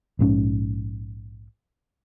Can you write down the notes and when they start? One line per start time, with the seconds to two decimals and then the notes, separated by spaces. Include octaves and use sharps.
0.19 A#1 G#2 C4 C#4